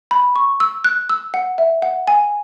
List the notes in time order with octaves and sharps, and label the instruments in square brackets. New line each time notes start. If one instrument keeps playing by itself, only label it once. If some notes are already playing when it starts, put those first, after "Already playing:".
[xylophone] B5
C#6
E6
F#6
E6
F#5
E5
F#5
G#5